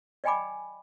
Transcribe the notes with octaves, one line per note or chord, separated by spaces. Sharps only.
D5 D#5 G5 G#5 B5 D6